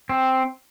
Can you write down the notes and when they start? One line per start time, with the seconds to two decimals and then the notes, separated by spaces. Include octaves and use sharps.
0.09 C4